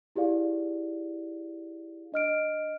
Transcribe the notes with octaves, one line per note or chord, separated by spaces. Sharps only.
E4 G4 G#4 D5 F5
D4 D#5 F6 D7